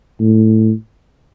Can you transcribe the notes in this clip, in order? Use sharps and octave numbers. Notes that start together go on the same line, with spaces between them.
A2